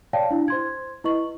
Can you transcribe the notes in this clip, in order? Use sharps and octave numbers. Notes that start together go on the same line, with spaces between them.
C#5 D5 F5 G5 A5
D4 E4
C5 C6 G#6
E4 B4 D#5 C#6 F#7